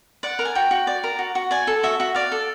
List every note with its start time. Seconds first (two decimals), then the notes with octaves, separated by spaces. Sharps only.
0.23 D5 F#5
0.39 A#4
0.45 G#5
0.55 F#4 G5
0.71 F#4
0.87 D5
1.04 A#4
1.19 F#4
1.35 F#4
1.51 D5 G#5
1.67 A4
1.83 F#4 E5
2.00 F#4 E5
2.15 D5 F5
2.32 A4